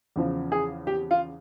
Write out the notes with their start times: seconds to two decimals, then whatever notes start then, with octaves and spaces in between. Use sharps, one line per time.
0.16 E2 C#3 F3
0.52 G#4
0.87 G4
1.11 F4